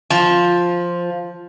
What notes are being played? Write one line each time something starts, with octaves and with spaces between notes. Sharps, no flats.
F3